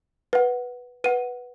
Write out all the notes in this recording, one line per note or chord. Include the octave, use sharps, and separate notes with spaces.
B4 F#5
B4 F#5 D#7